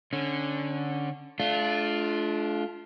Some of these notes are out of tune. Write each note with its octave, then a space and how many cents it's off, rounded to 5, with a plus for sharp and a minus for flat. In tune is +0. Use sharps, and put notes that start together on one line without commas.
D3 +0 C#4 -15
A3 -35 D4 +0 F4 +0